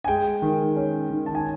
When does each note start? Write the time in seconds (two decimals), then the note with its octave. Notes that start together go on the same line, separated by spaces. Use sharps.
0.04 G#5
0.08 G#3 G5
0.42 D#3
0.76 C#4
1.10 D#3
1.26 A5
1.35 G#5